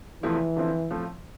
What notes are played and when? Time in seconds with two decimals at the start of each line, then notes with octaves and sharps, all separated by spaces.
0.22 E2 C3 E3 F3 A3 E4
0.56 D3 F3 C4 E4
0.91 A2 F3 A3 C4